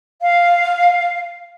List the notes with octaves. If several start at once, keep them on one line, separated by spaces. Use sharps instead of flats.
F5